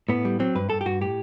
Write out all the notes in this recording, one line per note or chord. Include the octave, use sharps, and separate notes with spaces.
A2 B3
G3
F#3 C4
G2 B4
G2 A4
G4
G2 F#4
A2 G4